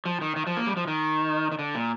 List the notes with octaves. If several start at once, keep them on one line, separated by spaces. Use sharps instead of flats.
F3
D#3
D#3
F3
A#3
G3
F3
D#3
D#3
D3
A#2